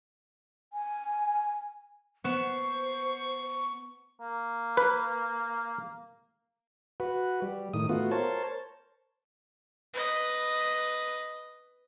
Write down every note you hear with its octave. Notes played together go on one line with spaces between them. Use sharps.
G#5
B3 C5 C#6 E7
A#3
B4
F#4 B4
G3
A2 D#3 D#6
A3 B3 F4 F#4
A#4 C5 C#5 A5
B4 D#5